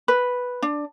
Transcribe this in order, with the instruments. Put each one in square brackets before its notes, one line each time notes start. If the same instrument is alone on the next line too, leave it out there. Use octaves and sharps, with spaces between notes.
[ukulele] B4
D4